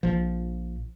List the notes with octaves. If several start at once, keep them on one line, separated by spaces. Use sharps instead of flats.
A#1 F3